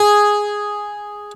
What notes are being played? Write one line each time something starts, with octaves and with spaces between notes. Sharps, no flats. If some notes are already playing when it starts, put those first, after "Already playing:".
Already playing: G#4